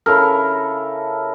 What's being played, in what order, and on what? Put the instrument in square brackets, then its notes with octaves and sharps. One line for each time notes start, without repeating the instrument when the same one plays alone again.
[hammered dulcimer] C#3 E4 A4 A#4